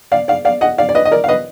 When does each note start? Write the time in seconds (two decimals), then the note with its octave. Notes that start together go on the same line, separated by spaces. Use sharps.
0.12 D5 F5
0.28 D5 F5
0.45 D5 F5
0.61 D#5 F#5
0.78 D5 F5
0.89 D5
0.95 B4 D#5
1.05 D#5
1.11 A#4 D5
1.24 F5
1.28 B4 D#5